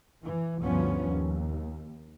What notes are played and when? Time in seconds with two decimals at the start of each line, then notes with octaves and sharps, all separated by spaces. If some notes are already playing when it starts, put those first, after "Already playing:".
0.23 E3
0.63 D2 G2 F3 B3 C#4
1.05 D#2